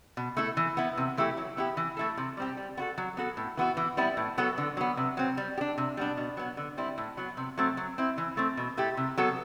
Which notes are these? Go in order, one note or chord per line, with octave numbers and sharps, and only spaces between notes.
B2
A3 E4 A4
E3
B3 E4
C3
E3 A3 E4 G4
F#3
B3 E4 G4
E3
A3 E4 A4
C3
G3 C4 G4
G3
B3 F#4 A4
F#3
B3 F#4 A4
A2
E3 B3 F#4
E3
G3 B3 E4
A2
F#3 B3 F#4 A4
D3
F#3 B3
C3
F#3 C4
G3
G4
D4
C3
G3 B3 D4
B2
F#3 B3
D3
G3 C4 E4
A2
F#3 B3
C3
F#3 A3 C4
F#3
C4 E4
E3
A3 C4
B2
A3 E4 G4
C3
F#3 B3 F#4 A4